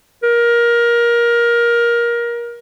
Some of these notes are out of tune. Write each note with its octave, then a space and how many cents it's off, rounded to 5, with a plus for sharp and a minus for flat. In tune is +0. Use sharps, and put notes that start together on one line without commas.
A#4 +20